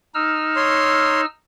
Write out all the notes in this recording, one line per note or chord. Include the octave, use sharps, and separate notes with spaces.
D#4 E6 F6
C#5 C6